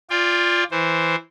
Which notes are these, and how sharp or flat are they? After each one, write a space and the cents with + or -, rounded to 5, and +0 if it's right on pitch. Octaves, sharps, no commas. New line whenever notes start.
F4 +0 D5 +0 G5 +40
E3 +0 C5 +0